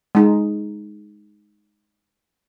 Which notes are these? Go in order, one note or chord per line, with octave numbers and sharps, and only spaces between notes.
G#3 D#4